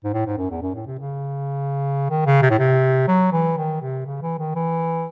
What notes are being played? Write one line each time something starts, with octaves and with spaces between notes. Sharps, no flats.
G#2
A2
G#2
F#2
E2
F#2
A2
C3
C#3
D#3
C#3
C3
A2
C3
F#3
E3
D#3
C3
C#3
E3
D#3
E3